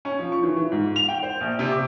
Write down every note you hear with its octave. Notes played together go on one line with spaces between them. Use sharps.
C#4
F3
C#6
E3
E3
G#2
F7
G5
C5
A#1
C3
D6